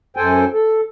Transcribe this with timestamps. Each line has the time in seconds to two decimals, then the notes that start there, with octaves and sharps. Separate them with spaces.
0.17 F#2 A4 C5 G5 G#5
0.53 A4